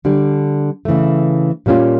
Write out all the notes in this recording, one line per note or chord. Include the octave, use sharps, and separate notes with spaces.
D3 G3 D4
C#3 E3 A3
A#2 G3 A#3 C#4 F4